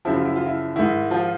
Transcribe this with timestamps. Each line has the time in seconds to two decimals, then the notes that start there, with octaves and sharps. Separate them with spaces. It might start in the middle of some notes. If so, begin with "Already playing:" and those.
0.05 F#2 C#3 F3 E4
0.16 F4
0.25 E4
0.36 F4
0.46 E4
0.76 G#2 D#3 E4
1.11 F3 F4